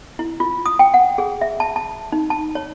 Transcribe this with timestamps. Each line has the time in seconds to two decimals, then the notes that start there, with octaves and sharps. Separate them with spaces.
0.19 E4
0.40 F4
0.66 D#6
0.79 G5
0.94 F#5
1.18 G#4
1.41 E5
1.60 A5
1.76 A5
2.12 D#4
2.30 A5
2.55 C#5